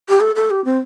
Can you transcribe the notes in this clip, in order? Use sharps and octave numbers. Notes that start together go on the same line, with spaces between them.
G4
A4
A4
G4
C4